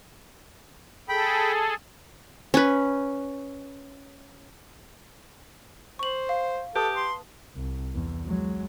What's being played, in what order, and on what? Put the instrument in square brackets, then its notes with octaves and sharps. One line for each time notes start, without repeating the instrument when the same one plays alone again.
[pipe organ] G#4 A4 [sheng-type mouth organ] G5 B5
[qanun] C#4 B4
[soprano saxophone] C5 [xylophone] C#6 F#7
[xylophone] F5
[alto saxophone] G4 [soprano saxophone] A4 [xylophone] B4 A5 D#6
[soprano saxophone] C6
[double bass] C2
E2
F#3 G#3